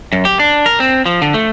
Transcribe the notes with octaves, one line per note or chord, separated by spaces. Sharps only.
F#2
G4
D4
A#4
C4
F3
D3
A3